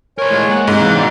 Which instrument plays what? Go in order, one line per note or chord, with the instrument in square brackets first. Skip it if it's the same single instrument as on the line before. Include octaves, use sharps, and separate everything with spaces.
[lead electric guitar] A#4 C5 [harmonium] C#5 G#5
[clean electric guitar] A2 G#3 F4
[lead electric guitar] G#3 [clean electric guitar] A#3 F#5
[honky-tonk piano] G#2 C3
[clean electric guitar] E3 C#4 [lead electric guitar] F5 [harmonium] F#5
[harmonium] B2 [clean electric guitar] G3 G4 D5